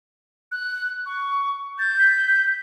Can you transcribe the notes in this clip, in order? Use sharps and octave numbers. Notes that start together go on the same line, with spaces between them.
F#6
C#6
G6 A6
B6